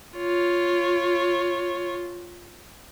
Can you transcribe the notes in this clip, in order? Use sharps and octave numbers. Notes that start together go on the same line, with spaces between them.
F4 C#5